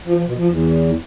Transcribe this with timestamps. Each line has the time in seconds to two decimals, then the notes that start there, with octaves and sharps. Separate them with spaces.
0.04 F3
0.15 F3
0.26 B2
0.37 F3
0.48 E2